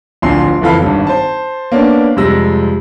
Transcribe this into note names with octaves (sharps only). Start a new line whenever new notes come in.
D1 A#1 F3 G#5 C6 C7
F#1 F2 E3 A4 F5 B5
G#1 G2
C5 A5
A#3 B3 C#4 D4
F2 C3 G3 G#3 E6 A#6